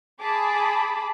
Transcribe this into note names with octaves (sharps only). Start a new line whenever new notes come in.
G#4 A5 B5 D6